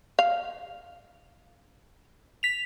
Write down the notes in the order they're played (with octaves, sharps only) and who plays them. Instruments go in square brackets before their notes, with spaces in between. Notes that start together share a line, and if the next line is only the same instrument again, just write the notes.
[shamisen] F5
[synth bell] B6 F7